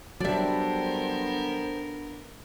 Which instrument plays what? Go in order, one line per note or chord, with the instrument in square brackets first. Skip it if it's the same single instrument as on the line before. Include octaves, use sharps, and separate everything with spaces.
[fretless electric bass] F#3 G3 [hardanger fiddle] B3 A#4 [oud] D4 E5 [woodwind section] A4 C5